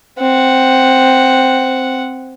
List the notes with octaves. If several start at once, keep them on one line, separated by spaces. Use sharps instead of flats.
C4 F#5